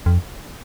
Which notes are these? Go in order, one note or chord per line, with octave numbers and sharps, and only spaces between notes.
F2